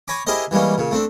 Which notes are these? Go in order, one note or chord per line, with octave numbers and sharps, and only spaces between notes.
C#5 G#5 A#5 B5 D6
E4 G4 G#4 A#4 C5 D#5
E3 G3 G#3 A#3 C#4
A#2 C#3
A3 C4 D4